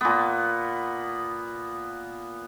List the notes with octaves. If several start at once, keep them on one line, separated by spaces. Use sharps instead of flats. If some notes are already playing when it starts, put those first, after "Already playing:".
A#2 B3